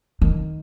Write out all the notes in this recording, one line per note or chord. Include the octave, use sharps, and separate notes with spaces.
D#3